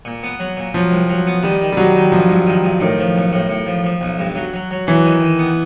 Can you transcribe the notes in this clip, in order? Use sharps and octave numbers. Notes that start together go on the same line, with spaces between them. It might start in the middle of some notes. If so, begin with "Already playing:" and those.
A#2
B3
F#3
A#2
F3 F#3
C2
F#3
B3
D#3 G3
D#3
G3
D#3 F#3
D#3
G2 F3
G2
D#3
G2
A2 D#3
F3
B1
A2
A2
F3
F3
B1
G2
F#3
F#3
F#3
E3 F#3
D#3
D#3
B3